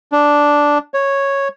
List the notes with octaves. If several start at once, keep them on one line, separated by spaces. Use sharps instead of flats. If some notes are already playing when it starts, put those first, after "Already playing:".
D4
C#5